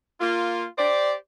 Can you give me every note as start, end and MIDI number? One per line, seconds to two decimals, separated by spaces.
0.21 0.64 58
0.21 0.64 65
0.77 1.13 67
0.77 1.13 72
0.77 1.13 74